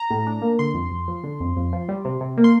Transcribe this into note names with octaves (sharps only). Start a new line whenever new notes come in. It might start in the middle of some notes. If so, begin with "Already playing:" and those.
Already playing: A#5
A2
D4
A#3
D3 C6
F2
F2
F3
D3
F2
F2
F3
G3
C3
C3
A#3
C6